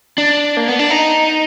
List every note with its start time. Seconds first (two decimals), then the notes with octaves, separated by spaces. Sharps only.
0.18 D4
0.57 A#3
0.68 B3
0.79 D4
0.90 D#4